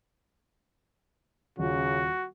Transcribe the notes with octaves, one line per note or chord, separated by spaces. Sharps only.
D#1 C#3 F4 F#4